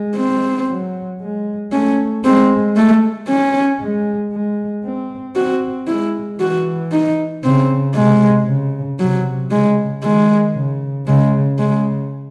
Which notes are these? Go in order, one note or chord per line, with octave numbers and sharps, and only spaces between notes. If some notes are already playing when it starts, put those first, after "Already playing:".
Already playing: G#3
C4
F#3
G#3
A3 C#4
G#3 C4
A3
C#4
G#3
G#3
C4
C4 F#4
G#3 E4
E3 F#4
D#4
C#3 C4
C3 G#3
C#3
C3 F#3
C#3 G#3
D#3 G#3
C#3
C#3 G#3
C#3 G#3